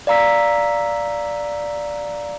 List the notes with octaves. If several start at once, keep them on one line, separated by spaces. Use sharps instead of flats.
D5 F5 A#5 E6 B6